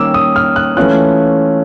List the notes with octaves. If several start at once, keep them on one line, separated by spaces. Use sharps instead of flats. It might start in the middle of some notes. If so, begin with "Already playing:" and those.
Already playing: D#3 G3 A#3 C#4 D6 E6
D#6
F6
F#6
E3 A3 C#4 F4 F#6